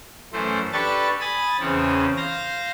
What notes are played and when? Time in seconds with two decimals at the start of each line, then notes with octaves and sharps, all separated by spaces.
0.33 F#2 E3 A3 C5
0.73 D4 G4 A4 B4 C#6 A6
1.20 G#5 B5 D#6 A6
1.60 E2 C#3 C4 C#4
2.17 C5 F5 A#6